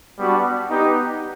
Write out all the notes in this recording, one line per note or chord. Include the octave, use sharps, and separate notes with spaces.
G3 B3 D4 F#4
B3 D#4 G4